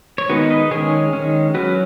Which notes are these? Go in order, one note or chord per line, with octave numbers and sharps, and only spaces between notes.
C#5
D#3 G#3 B3 D#4 F#4 B4
B4 D#5
D#3 G#3 C#4 G#4 C#5
D#3 G#3 C#4
F#3 C#4 F#4 B4